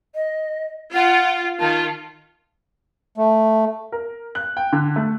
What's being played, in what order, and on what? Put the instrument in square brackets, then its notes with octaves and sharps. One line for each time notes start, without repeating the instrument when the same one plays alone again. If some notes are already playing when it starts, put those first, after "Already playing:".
[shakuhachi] D#5
[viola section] F4 [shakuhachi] F#5
[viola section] D#3 F4 [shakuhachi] A5
[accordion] A3
[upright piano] A#4
F#6
G5
D3
A3